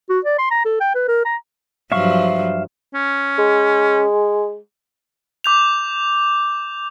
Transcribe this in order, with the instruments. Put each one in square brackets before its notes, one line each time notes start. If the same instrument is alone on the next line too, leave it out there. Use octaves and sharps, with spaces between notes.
[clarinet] F#4
D5
C6
A#5
A4
G5
B4
A#4
A#5
[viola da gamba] G2 F3 F#3 [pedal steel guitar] E5 F5 C#6
[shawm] C#4
[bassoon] G#3
[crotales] D6 G6 F7